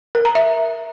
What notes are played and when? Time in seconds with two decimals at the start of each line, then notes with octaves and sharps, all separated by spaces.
0.15 A#4
0.25 A#5
0.35 E5